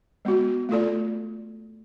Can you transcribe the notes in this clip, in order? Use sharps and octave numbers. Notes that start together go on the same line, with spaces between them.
G#3 B3 F#4
A3 F4 A4 D5